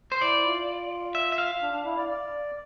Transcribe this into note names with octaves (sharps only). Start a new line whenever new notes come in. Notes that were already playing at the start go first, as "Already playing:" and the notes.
C5
E4 D5
F4
E5
E5
F5
D4
D4
E4
D5
D5